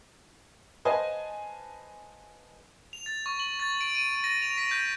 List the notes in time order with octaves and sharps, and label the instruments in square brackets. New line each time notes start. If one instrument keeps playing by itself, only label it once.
[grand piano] B4 C5 D#5 F5 G#5 A5
[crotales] F7
A6
C#6
F#7
A6
D7
D#7
A#6
F7
B6
G6